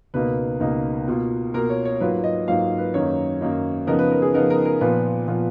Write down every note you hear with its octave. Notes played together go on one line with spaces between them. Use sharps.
C#2 B2 A#3 D#4 B4
C#2 B2 A#3 D#4
B2 A#3 F4
B2 A#3 F4 A#4
C#5
C#5
G#2 F#3 A#3 F4 B4
D#5
G#2 F#3 A#3 F4 F5
B4
F#2 D#3 A#3 D#4 C#5
F#2 D#3 A#3 D#4
C#3 F3 B3 D#4 A#4
B4
A#4
G#4
C#3 F3 B3 D#4 A#4
A#4
A#4
A#2 F3 B3 F4 B4
A#2 F3 B3 F4